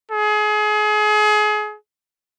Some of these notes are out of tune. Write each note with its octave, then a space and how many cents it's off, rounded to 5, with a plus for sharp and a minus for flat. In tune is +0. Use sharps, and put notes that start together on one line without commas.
G#4 +30